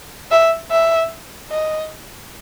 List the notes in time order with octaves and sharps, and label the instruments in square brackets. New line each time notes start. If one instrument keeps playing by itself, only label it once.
[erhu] E5
E5
D#5